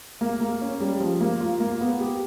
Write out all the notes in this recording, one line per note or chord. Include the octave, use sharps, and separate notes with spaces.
A#3
A#3
C#4
G3
F3
A#3
F4
A#3
B3
G4